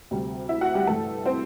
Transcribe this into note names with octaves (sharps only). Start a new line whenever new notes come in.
D2 C3 G3
E4 E5
F#4 F#5
G3 G4
G2 E3 G3 A3 A4
C4 C5